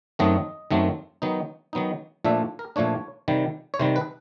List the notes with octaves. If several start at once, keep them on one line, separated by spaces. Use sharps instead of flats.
F#2 D#3 F#3 A3 C4 D#5
F#2 D#3 F#3 A3 C4
D#3 F#3 B3 D#4
D#3 F#3 B3 D#4
A#2 F3 A3 D4 E5
A#4
A#2 F3 A3 D4 C#5
C3 D#3 G3
C#5
C3 D#3 G3 C5
B4